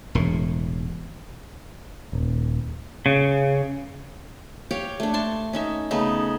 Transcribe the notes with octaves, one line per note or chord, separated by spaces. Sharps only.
E1 A2
D#1
C#3
G4 C#5 F5 G5
A3 D4
A5 C6 C#6
C#4 D#4 E5
C#3 A3 B3 D#4